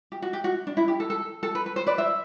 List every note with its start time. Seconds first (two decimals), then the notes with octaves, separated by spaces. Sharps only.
0.12 G4
0.22 F#4
0.33 G4
0.44 F#4
0.67 D4
0.77 E4
0.88 G4
1.00 A4
1.10 A4
1.43 A4
1.55 B4
1.66 B4
1.76 C5
1.87 B4 D5
1.98 C5 E5